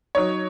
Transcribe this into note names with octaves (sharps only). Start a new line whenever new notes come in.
F#3 D#4 C#5